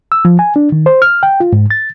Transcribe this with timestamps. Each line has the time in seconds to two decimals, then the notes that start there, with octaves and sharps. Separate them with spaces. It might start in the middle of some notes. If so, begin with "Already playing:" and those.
0.12 E6
0.25 F3
0.39 G#5
0.56 D4
0.72 D#3
0.86 C5
1.02 F6
1.23 G5
1.40 F4
1.53 G#2
1.71 A6